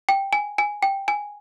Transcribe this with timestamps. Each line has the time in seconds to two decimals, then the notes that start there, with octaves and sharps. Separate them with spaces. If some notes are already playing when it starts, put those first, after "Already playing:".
0.09 G5
0.33 G#5
0.58 G#5
0.83 G5
1.08 G#5